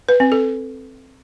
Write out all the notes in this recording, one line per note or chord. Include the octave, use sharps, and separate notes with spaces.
B4
C4
A4